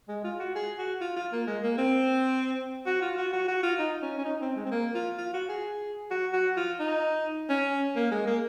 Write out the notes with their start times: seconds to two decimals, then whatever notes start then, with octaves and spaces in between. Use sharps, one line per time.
0.09 G#3
0.24 F4
0.39 F#4
0.55 G#4
0.78 F#4
1.01 F4
1.16 F4
1.33 A#3
1.47 G#3
1.63 A#3
1.78 C4
2.86 F#4
3.02 F4
3.18 F#4
3.33 F#4
3.48 F#4
3.63 F4
3.79 D#4
4.02 C#4
4.18 C#4
4.25 D#4
4.41 C4
4.56 G#3
4.65 C4
4.71 A#3
4.95 F4
5.18 F4
5.33 F#4
5.49 G#4
6.11 F#4
6.33 F#4
6.57 F4
6.80 D#4
7.50 C#4
7.96 A#3
8.11 G#3
8.27 A#3